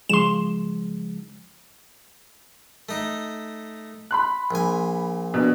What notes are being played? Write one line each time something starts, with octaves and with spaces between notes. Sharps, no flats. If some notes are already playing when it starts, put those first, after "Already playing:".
C#3 F3 G#3 C6 E7
A3 D#4
B5 C6 F#6
A#1 G#5
B2 D4